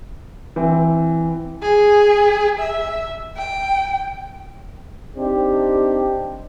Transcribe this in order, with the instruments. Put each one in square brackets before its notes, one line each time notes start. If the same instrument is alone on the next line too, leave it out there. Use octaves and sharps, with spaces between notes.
[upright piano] E3 C4
[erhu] G#4
E5
G5
[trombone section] C4 D4 D#4 G4